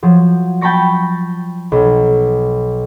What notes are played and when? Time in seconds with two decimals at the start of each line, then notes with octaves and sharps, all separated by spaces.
0.03 F3 F#3
0.61 G5 A5 B5 C#6 A#6
1.72 B1